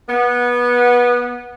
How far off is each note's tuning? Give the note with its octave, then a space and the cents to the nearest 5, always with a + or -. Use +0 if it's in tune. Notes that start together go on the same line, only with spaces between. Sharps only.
B3 -20